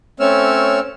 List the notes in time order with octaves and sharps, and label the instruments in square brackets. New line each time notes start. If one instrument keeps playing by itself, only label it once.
[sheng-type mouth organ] A3 C4 C#4 C#5 E6 F6